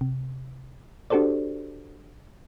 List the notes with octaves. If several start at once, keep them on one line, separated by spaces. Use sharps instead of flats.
C3
D4 F#4 G4 A4 C5 D5